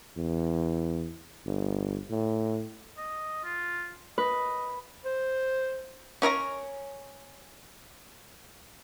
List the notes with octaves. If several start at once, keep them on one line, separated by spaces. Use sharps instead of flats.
E2
G1
A2
D#5
F4
B4 D#5
C5
C#4 A#4 C#5 A#5